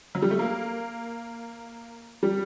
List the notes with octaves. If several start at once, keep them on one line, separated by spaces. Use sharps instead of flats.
F#3
G3
A3
A#3
G3